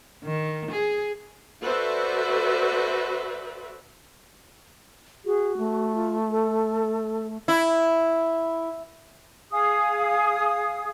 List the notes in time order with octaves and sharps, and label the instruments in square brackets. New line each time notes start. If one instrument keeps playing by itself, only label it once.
[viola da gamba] D#3
G#4
[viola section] F#4 A4 B4 C5 D5 E5
[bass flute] F#4 [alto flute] G#4
[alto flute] A3
[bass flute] F4
A4
[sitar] E4
[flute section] G#4 F5 D#6